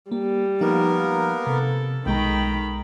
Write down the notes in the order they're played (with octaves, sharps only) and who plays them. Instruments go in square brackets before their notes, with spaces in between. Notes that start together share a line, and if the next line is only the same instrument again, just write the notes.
[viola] G3 [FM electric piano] A#3
[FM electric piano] F3 D#4 F5 [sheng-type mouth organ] A#3 B3 A#4
[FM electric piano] C3 A#5 [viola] A4
[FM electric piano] B1 G#3 A#5 [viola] D#3 B5 [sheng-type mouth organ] G5